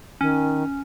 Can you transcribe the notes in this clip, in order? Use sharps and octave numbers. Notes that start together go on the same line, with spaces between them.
D#3 C#4